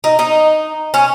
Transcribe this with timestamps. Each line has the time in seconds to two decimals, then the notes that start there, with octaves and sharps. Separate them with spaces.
0.04 D#4
0.19 D#4
0.94 C#4